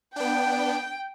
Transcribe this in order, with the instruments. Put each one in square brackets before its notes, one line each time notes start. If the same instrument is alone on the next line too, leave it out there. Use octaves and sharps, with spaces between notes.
[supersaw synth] B3 D4 [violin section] G5